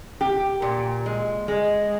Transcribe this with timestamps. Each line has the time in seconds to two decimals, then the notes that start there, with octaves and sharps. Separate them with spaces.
0.21 G4
0.62 A#2
1.06 G#3
1.48 G#3